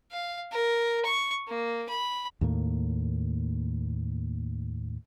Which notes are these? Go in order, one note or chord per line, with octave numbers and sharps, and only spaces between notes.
F5
A#4
C#6
A#3
B5
D#2 A2 A#3